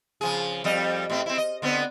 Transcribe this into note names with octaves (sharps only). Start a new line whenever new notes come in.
C#3 F3 G#4
F2 G3 D#5
A2 C4
C4 E4
D#5
D3 B3 C4